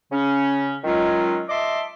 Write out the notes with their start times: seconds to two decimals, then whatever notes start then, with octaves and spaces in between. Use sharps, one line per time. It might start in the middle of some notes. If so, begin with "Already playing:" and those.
0.12 C#3 C#4
0.84 D#3 F#3 G#3 C#4 F4
1.50 D#5 E5 A5 C6 D6